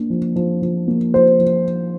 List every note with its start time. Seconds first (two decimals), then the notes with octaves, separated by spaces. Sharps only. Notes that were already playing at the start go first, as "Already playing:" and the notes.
Already playing: A#3 D4
0.10 F3
0.36 F3
0.62 F3
0.88 A#3
1.14 F3 C5
1.40 F3